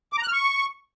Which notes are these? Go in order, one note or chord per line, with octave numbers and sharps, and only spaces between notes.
D6
A#5
F#6
F6
C#6